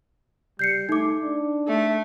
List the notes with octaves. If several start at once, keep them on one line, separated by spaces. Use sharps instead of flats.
G3 G6 C7 C#7
A3 D#4 D6
D4
A3